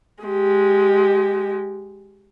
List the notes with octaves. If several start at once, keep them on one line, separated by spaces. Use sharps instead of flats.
G#3 G4